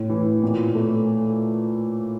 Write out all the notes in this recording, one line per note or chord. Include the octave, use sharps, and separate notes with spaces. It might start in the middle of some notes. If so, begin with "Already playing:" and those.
Already playing: A2
E3
A#2
A3